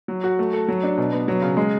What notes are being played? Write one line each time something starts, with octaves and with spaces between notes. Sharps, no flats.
F#3
F#4
A3
A4
F#3
D4
B2
B3
F#3
C#3
G#3